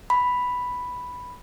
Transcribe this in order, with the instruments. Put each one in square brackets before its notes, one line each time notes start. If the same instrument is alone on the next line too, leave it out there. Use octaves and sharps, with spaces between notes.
[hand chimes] B5